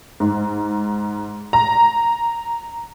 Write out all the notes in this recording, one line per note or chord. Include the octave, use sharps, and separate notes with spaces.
G#2
A#5